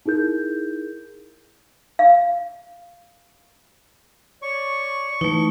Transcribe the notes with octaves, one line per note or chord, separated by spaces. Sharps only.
D#4 E4 G#4 A#4 G6
F5
C#5 D5 C#6
E3 A3 D#4